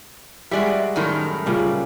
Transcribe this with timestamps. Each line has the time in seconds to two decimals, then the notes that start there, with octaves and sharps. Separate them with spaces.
0.51 G3 G#3 F#4 D5 E5
0.96 F#2 A2 D#3
1.46 A#2 C#3 G3